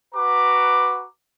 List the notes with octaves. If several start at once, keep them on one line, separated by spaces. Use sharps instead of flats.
F#4 B4 A#5 D6